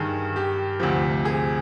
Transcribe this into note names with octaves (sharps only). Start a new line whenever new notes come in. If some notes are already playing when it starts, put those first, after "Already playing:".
Already playing: G2 D#3 G#4
G4
D2 C3 F3
G#4